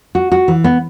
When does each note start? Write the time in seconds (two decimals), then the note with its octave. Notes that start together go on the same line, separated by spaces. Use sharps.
0.15 F#4
0.32 F#4
0.48 E3
0.64 B3